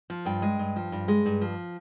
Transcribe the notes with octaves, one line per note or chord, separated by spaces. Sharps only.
F3
G2 G5
G#3
G2
F3
G2
G#3
G2
F3